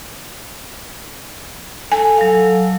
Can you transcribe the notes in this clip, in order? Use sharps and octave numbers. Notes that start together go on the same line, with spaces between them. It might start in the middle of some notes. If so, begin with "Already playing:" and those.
A4 G#5
F#3 F5